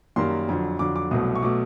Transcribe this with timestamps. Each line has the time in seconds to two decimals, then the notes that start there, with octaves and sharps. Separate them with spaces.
0.16 F#2 D#3 G3 A#3 C6
0.49 F2 D3 F#3
0.79 F2 D3 F#3 D6
0.96 D6
1.11 C2 B2 F#3 A3 D#6
1.35 C#6
1.43 B2 F#3 A3 D6